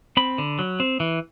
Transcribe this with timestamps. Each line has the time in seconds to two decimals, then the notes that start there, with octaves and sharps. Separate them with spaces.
0.17 C4 B5
0.38 D3
0.59 F#3
0.80 C4
1.00 E3